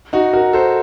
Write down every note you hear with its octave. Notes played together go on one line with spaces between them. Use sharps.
D#4 F#4
F#4 A#4
A4 C5